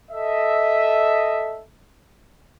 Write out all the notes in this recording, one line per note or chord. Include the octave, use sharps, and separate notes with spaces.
A4 D#5 E5